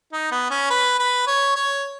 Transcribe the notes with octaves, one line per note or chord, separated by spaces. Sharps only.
D#4
B3
C#4
B4
B4
C#5
C#5